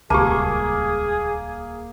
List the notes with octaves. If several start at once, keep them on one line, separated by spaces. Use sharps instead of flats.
D#1 C#2 A#3 G4 G#4 A5